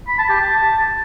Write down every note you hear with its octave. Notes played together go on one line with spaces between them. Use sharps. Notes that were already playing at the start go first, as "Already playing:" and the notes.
B5
A5
G4
A5